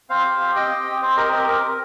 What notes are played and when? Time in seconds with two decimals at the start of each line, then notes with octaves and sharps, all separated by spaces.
0.10 C4 C5 F5
0.25 G4
0.40 C4
0.56 G4 D#5 G5
0.71 C4
0.86 C4
1.01 C4 C5
1.17 G4 A#4 D#5
1.32 C4 A#4 D#5
1.47 C4 A#4
1.63 C4